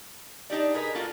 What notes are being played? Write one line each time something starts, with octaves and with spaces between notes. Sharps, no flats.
D4 D#4 G4 D5
G#4 A#4 B4 D#5
A#3 F4 F#4 A4